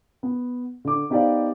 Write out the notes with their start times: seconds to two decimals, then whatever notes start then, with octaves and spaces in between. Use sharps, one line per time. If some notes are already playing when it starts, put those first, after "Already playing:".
0.23 B3
0.85 D3 D6
1.10 B3 D#4 G4 C5 D5 F5